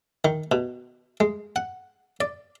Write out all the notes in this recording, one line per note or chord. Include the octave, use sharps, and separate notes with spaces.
D#3
B2
G#3
F#5
D5